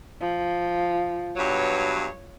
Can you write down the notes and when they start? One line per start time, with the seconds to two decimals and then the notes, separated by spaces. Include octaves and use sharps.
0.21 F3
1.36 G2 B2 F#3 C#5